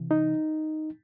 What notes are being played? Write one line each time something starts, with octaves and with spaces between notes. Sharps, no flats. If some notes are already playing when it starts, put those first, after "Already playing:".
Already playing: C3 E3
D#4